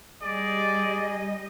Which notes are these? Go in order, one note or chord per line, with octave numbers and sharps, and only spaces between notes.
G3 G#4 D5 D#5